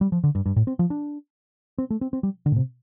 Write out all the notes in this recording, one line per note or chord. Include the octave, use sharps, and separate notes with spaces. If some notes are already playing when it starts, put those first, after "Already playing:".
G3
F3
D3
G2
G2
A2
C4
F3
D4
C4
A3
C4
C4
G3
D3
A2
C3